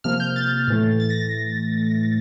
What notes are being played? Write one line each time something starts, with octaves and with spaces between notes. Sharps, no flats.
C3 F3 A#3 F6
G6
A6
A2 E3 A3
A6
A#6